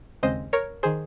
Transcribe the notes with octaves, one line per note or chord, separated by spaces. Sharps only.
D#2 C#3 G#3 C4 C5 D#5
A#4 C#5
D#3 G#4 C5